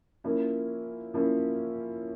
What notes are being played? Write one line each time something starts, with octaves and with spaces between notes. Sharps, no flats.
F3 A#3 C#4 E4
F3 A#3 C#4 E4